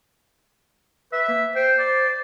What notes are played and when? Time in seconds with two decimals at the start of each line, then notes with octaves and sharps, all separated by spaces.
1.12 B4 E5
1.28 A#3
1.56 C5 G5
1.79 D5